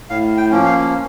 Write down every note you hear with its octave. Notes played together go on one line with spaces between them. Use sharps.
A2 F5
G5
F3 A#3 C#4
F5